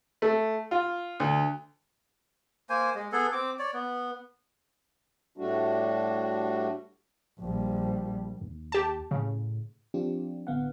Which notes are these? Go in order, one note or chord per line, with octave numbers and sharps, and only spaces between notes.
A3
F4
D2
A#3 C5 G#5
G#3
B3 G#4 A4
C4 D6
C#5 D5
B3
A2 G3 A3 D4 F#4
A#1 G3
D#2
G4 A5
A2 C#3
F3 C4 D4 F4 G4
A1 D3 B3 F5 F#5